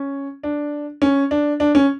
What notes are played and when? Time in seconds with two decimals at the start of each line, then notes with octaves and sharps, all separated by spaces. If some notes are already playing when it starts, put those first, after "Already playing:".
Already playing: C#4
0.43 D4
1.02 C#4
1.31 D4
1.60 D4
1.75 C#4